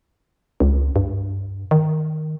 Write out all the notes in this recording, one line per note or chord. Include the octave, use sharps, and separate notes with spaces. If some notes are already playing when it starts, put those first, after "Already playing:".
C#2
G2
D#3